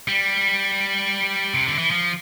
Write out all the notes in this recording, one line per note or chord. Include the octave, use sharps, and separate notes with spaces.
G3
C3
D3
E3
F3